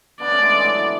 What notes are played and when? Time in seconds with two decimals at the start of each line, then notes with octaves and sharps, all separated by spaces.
0.20 B3 D4 D5
0.31 A3 C#4
0.42 G#3 B3
0.53 E3 G#3
0.64 D3 F#3
0.76 E3